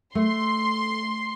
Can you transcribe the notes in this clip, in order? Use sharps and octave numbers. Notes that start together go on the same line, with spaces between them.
A3 C6